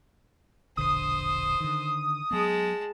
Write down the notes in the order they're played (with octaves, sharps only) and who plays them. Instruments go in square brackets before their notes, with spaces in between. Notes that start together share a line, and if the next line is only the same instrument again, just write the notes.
[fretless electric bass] E1 A#1 D3 [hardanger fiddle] C5 [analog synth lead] D#6
[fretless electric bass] D3 D#3
[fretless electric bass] F#3 B3 [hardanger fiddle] G#3 A5